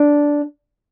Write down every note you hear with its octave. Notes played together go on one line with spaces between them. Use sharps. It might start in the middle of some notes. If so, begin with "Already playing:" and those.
Already playing: D4